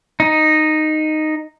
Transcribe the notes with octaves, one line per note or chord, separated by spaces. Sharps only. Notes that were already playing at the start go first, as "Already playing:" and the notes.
D#4